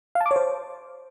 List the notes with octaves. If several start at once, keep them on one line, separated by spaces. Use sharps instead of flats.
F5
A5
D6
C#5
C5